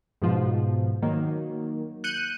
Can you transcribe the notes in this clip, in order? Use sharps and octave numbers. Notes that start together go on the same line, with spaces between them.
G#2 B2 F3
D#3 F#3 A#3
F#6 G6 C#7 D#7